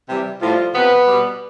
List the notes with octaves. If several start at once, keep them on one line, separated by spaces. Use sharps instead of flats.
C3 E3 G3
A2 F3 G3 F4
C3 F3 B3 B4
B2 G3